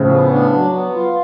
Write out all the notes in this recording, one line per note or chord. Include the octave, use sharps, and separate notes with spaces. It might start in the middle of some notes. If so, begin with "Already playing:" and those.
Already playing: A2 C#3 F3
B3
D4
F#3
B3
F4